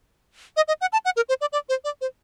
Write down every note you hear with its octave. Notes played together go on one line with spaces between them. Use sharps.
D#5
D#5
F#5
A5
F#5
A#4
C5
D5
D5
C5
D5
C5